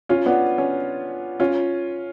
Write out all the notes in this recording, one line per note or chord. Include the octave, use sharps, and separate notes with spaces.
C#4 F4
B3 D4
C#4
C#4 F4